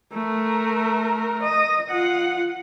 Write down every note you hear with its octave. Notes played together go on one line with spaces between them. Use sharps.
A3 A#4
D#5
F4 F#5